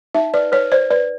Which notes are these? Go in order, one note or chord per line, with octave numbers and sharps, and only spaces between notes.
D#4 E5
B4 D5
B4 C#5
C5 D5
B4 D5